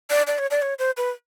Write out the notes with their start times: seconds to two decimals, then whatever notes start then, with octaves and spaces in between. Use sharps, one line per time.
0.10 D5
0.27 D5
0.39 C#5
0.51 D5
0.62 C#5
0.79 C5
0.97 B4